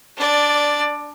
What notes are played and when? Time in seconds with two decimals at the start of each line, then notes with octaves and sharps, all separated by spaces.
0.17 D4 D5